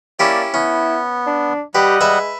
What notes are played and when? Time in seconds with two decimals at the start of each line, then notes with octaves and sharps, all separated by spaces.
0.19 A#3 C#4 E4 G4 D5
0.54 B3 C#4 E4
1.27 D4
1.75 G3 G4 B4 D#5 F#5
2.01 G#3 B4 E5